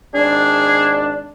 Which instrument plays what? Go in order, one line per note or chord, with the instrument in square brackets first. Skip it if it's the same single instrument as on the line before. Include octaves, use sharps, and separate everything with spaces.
[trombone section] G#1 D4 [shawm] G#4